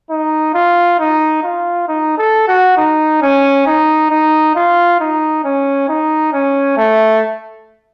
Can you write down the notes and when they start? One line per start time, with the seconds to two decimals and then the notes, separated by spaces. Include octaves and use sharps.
0.10 D#4
0.54 F4
0.99 D#4
1.43 F4
1.88 D#4
2.18 A4
2.48 F#4
2.77 D#4
3.22 C#4
3.67 D#4
4.10 D#4
4.55 F4
5.00 D#4
5.45 C#4
5.88 D#4
6.33 C#4
6.77 A3